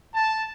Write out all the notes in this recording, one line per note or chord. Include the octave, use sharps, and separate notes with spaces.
A5